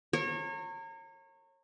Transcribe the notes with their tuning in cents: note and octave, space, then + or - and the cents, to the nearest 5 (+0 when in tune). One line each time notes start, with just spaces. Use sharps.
A#4 -35 C#5 -30